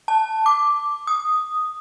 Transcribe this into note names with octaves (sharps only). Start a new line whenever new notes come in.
A5
D6
D#6